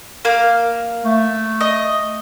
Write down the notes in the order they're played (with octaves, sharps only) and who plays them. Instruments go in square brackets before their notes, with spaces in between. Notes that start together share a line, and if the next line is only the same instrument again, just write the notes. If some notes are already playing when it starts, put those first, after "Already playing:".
[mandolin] A#3 F5
[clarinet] A3
[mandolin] D#5